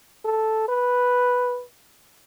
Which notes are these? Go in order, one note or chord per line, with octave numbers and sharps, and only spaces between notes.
A4
B4